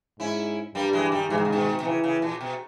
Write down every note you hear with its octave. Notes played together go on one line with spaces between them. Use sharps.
G#2 C#4 E4
G2 G3 A#3
E3 G#3
D#3 G3
G#2 E3
D#3
C#3
B2 D#3
B2
C#3 E3
C#3
A#2
B2